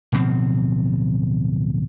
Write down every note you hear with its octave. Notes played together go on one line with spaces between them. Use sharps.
D1 B2 F3 C4